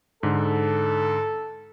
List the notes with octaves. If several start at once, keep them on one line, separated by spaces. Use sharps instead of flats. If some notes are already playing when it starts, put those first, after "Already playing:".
G#2 D3 A4